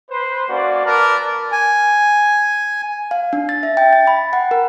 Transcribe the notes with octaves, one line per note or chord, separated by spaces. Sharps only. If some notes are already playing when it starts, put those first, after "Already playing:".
B4 C5
A#3 C#4 F#4 D5
A#4 B4 D5 A5 A#5
G#5
F5
D4
A6
E5
G5
A6
B5
F#5
A#4